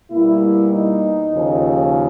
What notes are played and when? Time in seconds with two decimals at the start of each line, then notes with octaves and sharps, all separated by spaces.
0.12 B2 G3 A#3 E4
0.72 D#4
1.32 D#2 C#3 F3